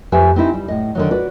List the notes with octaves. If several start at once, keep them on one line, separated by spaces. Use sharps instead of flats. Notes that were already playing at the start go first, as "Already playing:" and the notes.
F2 G4 B4 E5 G#5
C4 D#4 E4
G3
A2 D#5
D3 D#3 F#3
F#4 B4 D5